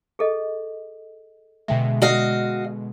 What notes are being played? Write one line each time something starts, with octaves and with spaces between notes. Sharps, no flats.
G#4 A4 D#5
B2 D3 G#3 E5 G5
F#4 D#5 F5